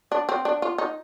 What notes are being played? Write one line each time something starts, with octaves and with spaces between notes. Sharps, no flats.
D4
C4
D4
F4
D#4